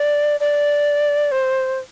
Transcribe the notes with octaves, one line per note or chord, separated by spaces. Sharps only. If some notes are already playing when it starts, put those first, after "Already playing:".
Already playing: D5
D5
C5